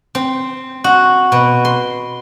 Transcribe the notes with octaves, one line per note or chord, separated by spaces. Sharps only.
C4
F#4
B2
C6